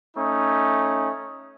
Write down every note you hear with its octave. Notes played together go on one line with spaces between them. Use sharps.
A3 C#4 D#4